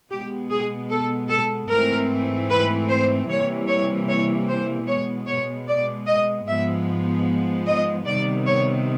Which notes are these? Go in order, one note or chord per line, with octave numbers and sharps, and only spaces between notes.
B2 G#3 B3 G4
G#4
A4
A4
G#2 E3 A3 C4 A#4
B4
C5
C3 E3 G3 A#3 C#5
C#5
C#5
C5
B2 G#3 B3 C#5
C#5
D5
D#5
G#2 F3 G#3 B3 E5
D#5
C3 D#3 G3 B3 D5
C#5